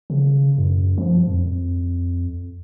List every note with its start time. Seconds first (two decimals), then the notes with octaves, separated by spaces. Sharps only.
0.10 C#3
0.58 F#2
0.98 F3
1.28 F2